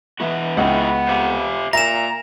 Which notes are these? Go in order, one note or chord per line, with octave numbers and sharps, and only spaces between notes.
E3 B3 F#4
C#2 B3 E4 F#4 F#5
G4 C5 F5
A#2 E5 A#5 A#6 E7